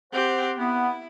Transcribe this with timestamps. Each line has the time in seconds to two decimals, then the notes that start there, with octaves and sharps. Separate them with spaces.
0.13 C4 G4 C5 F#5
0.58 B3 E4